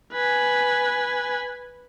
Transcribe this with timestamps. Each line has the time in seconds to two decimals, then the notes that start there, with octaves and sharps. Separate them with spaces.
0.13 B4 G#5